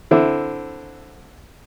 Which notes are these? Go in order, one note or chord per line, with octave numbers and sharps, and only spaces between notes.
D3 C4 E4